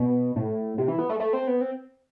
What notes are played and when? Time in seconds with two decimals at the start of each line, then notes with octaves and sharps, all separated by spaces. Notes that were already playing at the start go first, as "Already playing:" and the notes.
Already playing: B2
0.36 A2
0.78 C3
0.88 E3
0.99 B3
1.09 A3
1.20 A3
1.33 C4
1.48 B3
1.61 C4